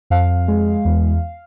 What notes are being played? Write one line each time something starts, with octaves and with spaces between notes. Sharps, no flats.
F2 F5
G#3
E2